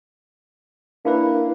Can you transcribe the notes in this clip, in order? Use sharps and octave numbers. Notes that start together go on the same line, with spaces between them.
A#3 D4 E4 B4